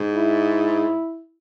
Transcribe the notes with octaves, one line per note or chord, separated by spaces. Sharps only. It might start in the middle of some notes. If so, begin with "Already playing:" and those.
Already playing: G#2
E4